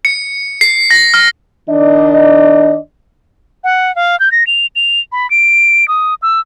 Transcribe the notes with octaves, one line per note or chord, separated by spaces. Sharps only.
C#7
C7
A#6
F6
D#3 D4 D5 D#5
F#5
F5
G6
A#6
F7
F7
B5
D7
D#6
E6